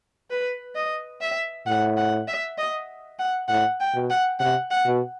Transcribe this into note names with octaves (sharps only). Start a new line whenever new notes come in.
B4
D#5
E5
A2 F#5
F#5
E5
D#5
F#5
A2 F#5
G5
B2
F#5
C3 F#5
F#5
B2